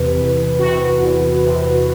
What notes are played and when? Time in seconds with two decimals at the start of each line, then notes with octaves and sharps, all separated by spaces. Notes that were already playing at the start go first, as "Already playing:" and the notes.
Already playing: E2 C3 E3 B4
0.18 E2
0.59 C3 F#4
1.01 E2
1.43 C3